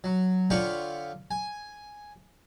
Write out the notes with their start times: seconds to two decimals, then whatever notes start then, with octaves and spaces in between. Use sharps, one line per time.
0.04 F#3
0.50 D3 F4 C#5 G5 B5 C#6
1.31 G#5